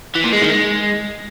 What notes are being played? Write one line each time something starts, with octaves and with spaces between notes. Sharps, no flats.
E3
A#2
G#3
D#3
G#3